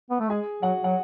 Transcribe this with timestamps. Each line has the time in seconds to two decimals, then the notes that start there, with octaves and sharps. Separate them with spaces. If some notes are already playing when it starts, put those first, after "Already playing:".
0.11 B3
0.20 A3
0.30 G#3 G#4 G#5
0.62 F#3 F#4 F#5
0.84 F#3 F#5